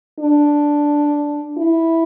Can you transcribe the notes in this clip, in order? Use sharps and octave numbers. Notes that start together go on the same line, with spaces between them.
D4
E4